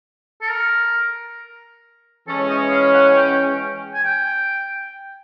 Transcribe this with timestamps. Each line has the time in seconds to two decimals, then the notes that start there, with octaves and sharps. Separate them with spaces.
0.41 A4
0.50 A#4
2.27 E3 G#3 C#4 A4
2.49 D#5
2.71 F5
2.94 F#5
3.16 G5
3.94 G#5
4.04 G5